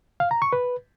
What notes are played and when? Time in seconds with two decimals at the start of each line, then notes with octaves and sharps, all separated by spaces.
0.20 F5
0.31 A#5
0.42 C#6
0.53 B4